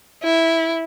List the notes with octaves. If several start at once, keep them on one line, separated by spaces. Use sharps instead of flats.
E4